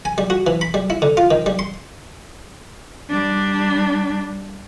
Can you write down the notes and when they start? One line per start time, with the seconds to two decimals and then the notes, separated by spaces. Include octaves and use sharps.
0.05 G#5
0.18 G3
0.30 F#4
0.47 E3
0.61 B5
0.74 G3
0.90 E4
1.02 D3
1.17 F4
1.31 D#3
1.46 G3
1.59 C6
3.11 G3 D4